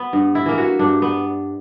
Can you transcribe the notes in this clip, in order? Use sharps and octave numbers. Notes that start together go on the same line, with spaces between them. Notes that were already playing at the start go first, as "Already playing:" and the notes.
Already playing: B3
G2
E4
E3 A#3
F#4
G2 D4
B3